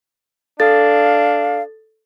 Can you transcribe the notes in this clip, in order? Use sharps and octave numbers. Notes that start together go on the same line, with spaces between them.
D4 A4 F5 A6